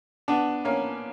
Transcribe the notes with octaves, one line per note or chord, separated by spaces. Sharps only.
B3 D4
A#3 C#4